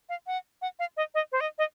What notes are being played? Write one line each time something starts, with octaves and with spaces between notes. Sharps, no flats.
F5
F#5
F#5
F5
D#5
D#5
C5
D#5
D#5